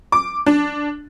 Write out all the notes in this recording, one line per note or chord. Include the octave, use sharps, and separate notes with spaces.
D6
D4